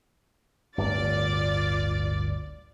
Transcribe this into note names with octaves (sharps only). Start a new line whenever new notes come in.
D1 G1 F4 D5 A6